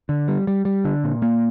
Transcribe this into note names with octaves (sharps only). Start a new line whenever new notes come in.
D3
G3
G3
G3
D3
A#2
A#3